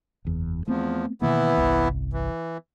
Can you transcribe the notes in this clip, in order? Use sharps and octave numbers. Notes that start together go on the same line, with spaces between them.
F#1 E2
E2 F3 A3 B3 C4
B2 D#3 E3 A#3 B3 E4
G1 C2
E3